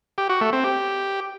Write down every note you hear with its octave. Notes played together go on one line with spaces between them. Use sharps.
G4
F#4
A3
C4
G4